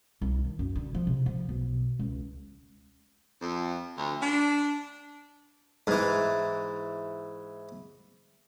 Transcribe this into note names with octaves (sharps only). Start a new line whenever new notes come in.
C2
D#3
F#2
D3
F3
C3
F3
B1
C#2
F2
D2
D4
G#2 E3